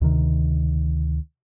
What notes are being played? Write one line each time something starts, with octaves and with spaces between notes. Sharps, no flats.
D2 C3 D#3